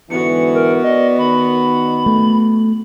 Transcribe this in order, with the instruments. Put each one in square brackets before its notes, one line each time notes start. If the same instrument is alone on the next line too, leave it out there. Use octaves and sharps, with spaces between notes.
[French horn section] G#2 D3 E3 [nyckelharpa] B3 F#4 [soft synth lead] C#7
[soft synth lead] A#4
[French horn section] D5 [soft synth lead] D#5
[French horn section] D#3 [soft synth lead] B5
[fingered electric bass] A3